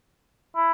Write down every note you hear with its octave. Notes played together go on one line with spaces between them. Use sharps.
E4